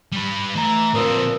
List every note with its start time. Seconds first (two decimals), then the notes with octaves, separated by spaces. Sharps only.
0.12 G3 B4
0.55 E3 A3 A#5
0.94 A#2 F3 C4 D4 A#4 B4 D#6 E6